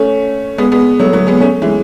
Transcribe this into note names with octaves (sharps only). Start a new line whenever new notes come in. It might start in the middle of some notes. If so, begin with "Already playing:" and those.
Already playing: A3 C#4
G#3 B3
G#3 B3
F#3 A3
F#3 A3
G#3 B3
A3 C#4
E3 G#3